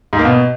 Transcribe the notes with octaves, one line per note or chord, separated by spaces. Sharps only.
G#2
A#3
B2